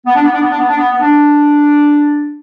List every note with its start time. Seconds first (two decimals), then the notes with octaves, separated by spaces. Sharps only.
0.06 B3
0.14 D4
0.23 B3
0.32 D4
0.41 B3
0.51 D4
0.59 B3
0.69 D4
0.78 B3
0.92 B3
1.00 D4